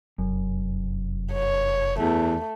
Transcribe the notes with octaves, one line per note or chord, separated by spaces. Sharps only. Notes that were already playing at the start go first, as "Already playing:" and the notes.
F1 F#2
C#5
E2 A3